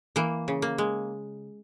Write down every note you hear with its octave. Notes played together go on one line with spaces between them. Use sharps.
E3 A#3
C#3
A#3
G#3